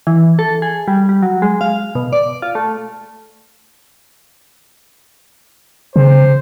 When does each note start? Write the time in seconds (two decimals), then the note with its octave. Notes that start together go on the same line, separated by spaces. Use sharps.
0.07 E3
0.39 A4
0.62 G#4
0.88 G3
1.09 G3
1.22 F#3
1.42 G#3
1.61 F5
1.95 B2
2.13 D5
2.42 F4
2.55 A3
5.96 C#3 C5